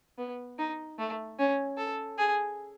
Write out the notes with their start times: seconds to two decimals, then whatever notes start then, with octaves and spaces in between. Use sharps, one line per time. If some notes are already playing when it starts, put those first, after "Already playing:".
0.18 B3
0.58 D#4
0.99 A3
1.38 C#4
1.78 A4
2.18 G#4